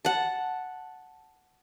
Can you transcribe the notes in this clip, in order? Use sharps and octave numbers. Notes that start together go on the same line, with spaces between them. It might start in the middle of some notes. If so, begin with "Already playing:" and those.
F#5 A5